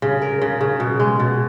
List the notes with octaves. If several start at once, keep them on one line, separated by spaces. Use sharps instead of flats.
C#3
A#4
C#3
C#3
B2
G#3
B2